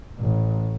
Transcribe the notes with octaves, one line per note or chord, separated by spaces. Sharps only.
A1